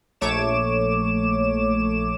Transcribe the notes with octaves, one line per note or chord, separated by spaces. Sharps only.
A#1 A3 C#5 D6 E7